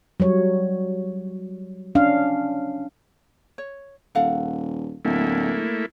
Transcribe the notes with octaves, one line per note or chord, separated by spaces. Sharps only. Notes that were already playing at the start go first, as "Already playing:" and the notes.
F#3 G3 C#5
C#4 D4 F5
C#5
D#1 A4 F5 F#5
D1 A3 A#3 E4